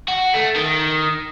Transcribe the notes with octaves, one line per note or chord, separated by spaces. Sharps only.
F#4
A3
D#3